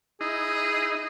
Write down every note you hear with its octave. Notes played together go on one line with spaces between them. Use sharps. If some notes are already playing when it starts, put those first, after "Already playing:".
D#4 E4 G#4 D#5